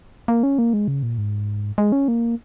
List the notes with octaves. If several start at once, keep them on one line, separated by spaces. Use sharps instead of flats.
A#3
C#4
A#3
G#3
C#3
A#2
G#2
G#3
C#4
A#3